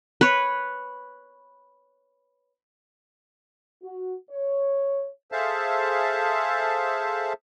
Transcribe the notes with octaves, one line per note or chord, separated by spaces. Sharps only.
B4 C#5
F#4
C#5
G#4 A4 C5 E5 F5 A5